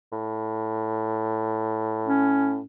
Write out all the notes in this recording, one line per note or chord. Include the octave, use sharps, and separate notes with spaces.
A2
C#4